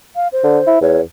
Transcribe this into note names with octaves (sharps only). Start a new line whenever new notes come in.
F5
C5
D3
E4
E2 C#5